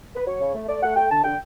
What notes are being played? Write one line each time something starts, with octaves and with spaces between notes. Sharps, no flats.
B4
F#3 C#5
C#3
A3
A3 D5
A3 F#5
A3 G5
D3 A5
D3 G5